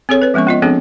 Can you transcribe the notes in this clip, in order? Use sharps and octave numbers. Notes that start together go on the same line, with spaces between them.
C4 G#4 A4 C#5
B4 C#5
F3 G#3 B3 C#4 C#6
B3 F4 D#5
F3 B3 C4 D4 G#4 A4